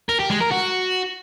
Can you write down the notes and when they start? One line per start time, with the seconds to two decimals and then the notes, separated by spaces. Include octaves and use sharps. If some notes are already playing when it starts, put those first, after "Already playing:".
0.09 A#4
0.20 G4
0.31 G#3
0.41 A#4
0.52 F#4